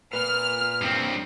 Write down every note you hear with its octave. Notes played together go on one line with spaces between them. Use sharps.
A#2 B4 F6
G2 C4